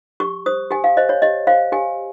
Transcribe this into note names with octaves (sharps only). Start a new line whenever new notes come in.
G4 C#6
C5 D#6
G4 G#5
F5
C5 D#5
C#5
G4 D#5
C5 F5
G4 G#5